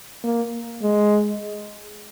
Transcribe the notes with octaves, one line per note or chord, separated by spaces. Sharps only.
A#3
G#3